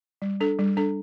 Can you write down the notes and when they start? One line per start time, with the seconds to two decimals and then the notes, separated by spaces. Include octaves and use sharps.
0.22 G3
0.41 D4 A4
0.59 G3
0.77 D4 A4